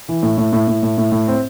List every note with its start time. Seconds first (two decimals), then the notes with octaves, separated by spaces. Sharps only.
0.09 E3
0.23 A2
0.38 A2
0.53 A2
0.68 A2
0.83 A2
0.98 A2
1.12 A2
1.28 C4